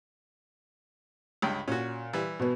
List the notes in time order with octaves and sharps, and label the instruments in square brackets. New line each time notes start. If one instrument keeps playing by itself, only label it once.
[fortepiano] C#2 G2 G5
[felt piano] A#2 [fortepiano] C#4 F#4
[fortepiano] E3 G3
[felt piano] B2 B3